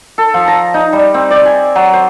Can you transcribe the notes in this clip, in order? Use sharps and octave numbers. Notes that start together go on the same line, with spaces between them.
A4
F3
A#5
D#4
G3
C4
D5
G#5
F#3
C5